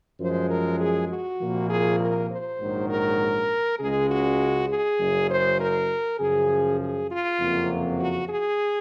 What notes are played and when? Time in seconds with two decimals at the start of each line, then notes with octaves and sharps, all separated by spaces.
0.19 F#2 F3 G#3 C5
0.49 A#4
0.79 G#4
1.09 F#4
1.39 C2 A#2 F3 A#3
1.69 G#4
1.99 A#4
2.29 C5
2.59 A#1 G#2 D#3 F#3
2.89 A#4
3.79 C#2 C#3 G#3 G#4
4.09 F#4
4.68 G#4
4.99 F#1 F#2 C#3
5.29 C5
5.59 A#4
6.19 F#2 C#3 F3 G#4
6.79 G#4
7.09 F4
7.39 F#1 F2 C3 F#3 A#3
7.99 F#4
8.29 G#4